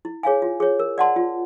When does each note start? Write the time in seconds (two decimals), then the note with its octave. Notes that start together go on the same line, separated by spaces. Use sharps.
0.05 E4
0.23 G#4 C#5 F5 G#5
0.42 F4
0.60 G#4 C#5
0.79 A#4
0.98 D5 F#5 A5 C6
1.16 F4